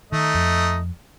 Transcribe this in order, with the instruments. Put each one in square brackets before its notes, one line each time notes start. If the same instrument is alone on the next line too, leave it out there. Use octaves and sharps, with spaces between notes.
[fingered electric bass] D#3 [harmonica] A3 D#4 D#5
[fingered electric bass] F2